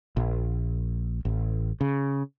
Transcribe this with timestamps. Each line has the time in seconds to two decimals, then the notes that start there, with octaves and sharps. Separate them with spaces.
0.17 A#1
1.25 A1
1.81 C#3